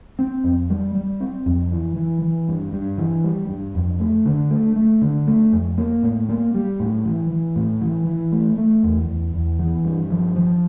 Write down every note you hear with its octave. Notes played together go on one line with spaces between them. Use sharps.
C4
F2
G3
G3
C4
F2
E3
E3
E3
G2
G2
E3
G3
G2
F2
A3
D3
A3
A3
D3
A3
F2
A#3
A2
A#3
G3
A2
E3
E3
A2
E3
E3
A3
A3
E2
E2
E2
E3
G2
F3
F3